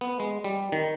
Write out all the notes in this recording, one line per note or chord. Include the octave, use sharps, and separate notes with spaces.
B3
G#3
G3
D#3